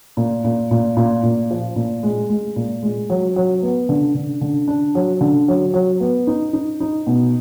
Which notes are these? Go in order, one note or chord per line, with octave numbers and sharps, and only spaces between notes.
A#2
A#2
A#2
A#2
A#2
F3
A#2
G#3
G#3
A#2
G#3
F#3
F#3
B3
D3
D3
D3
D4
F#3
D3
F#3
F#3
B3
D#4
D#4
D#4
B2